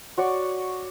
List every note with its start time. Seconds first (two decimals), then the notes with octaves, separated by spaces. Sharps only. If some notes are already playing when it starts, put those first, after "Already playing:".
0.18 F#4 C#5 D5